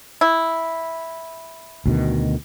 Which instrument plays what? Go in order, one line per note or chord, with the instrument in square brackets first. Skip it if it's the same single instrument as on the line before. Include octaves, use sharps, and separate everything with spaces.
[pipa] E4
[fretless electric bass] D2 B2 D#3